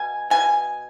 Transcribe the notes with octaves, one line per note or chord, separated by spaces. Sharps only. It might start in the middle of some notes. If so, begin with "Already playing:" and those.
Already playing: B2 G#5
B2 G#5